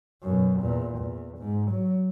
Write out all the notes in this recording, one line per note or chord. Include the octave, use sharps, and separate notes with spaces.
F#2 B2
E2 A#2
E2
G#2
F#3